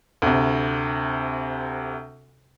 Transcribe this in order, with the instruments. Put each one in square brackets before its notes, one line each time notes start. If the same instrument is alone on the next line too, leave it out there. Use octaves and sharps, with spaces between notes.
[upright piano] D2 C3